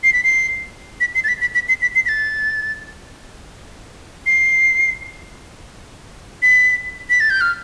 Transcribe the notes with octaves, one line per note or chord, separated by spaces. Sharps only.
C7
B6
C7
B6
C7
A6
B6
B6
B6
C7
B6
C7
B6
A6
C7
B6
B6
A6
G6
F6